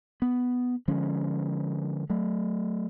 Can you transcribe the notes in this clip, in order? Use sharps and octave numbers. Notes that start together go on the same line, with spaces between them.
B3
D3 F3 G#3 C#4
F#3 A3